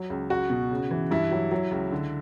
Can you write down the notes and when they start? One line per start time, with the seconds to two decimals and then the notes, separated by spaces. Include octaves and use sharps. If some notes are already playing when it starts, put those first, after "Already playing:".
Already playing: F#3
0.10 C#2
0.30 C#2 F#4
0.50 B2
0.71 C#3
0.91 E3
1.11 G2 E4
1.31 F#3
1.51 F#3
1.71 C#2
1.92 D3